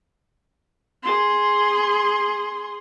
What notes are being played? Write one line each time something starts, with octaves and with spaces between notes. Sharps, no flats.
G#4 C6